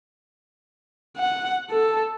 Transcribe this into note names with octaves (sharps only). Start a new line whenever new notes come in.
F#5
A4